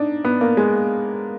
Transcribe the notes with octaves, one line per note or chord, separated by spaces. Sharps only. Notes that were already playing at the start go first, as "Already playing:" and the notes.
Already playing: D4 D#4
B3
A#3
G#3